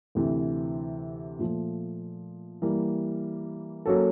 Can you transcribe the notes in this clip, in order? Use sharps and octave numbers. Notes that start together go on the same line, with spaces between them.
D2 C3 E3
A#2 F3 A3
E3 G3 A#3
F#3 A#3 C#4 F#4 A4